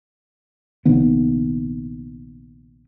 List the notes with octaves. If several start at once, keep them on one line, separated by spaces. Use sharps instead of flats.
A#1 C3 D#3 B3